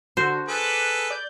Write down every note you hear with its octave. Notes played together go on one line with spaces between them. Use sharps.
D3 F#4 C5
G#4 A4 B4 D6 F#6
D5 G6